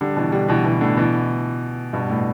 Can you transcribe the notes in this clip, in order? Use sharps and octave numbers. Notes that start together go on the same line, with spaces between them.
D3 G3
B2 E3
D3 G3
B2 E3
B2 E3
A2 D3
B2 E3
G2 B2
A2